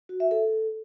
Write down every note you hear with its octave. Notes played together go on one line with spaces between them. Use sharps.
F#4
E5
A4